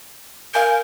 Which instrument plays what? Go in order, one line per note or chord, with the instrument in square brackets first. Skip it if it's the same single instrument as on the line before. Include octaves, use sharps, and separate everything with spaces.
[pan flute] A#4 [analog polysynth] F5 G#5 G6